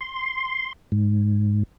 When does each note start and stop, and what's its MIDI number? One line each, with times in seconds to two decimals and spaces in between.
0.01 0.73 84
0.92 1.63 44